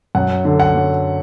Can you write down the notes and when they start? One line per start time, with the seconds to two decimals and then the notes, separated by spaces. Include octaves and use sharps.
0.15 F#2 F#5
0.45 D3
0.60 F#5
0.75 F#3